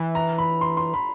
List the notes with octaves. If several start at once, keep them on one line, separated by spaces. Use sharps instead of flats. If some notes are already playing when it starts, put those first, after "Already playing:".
Already playing: E3
A#5
B5
C6
C6
B5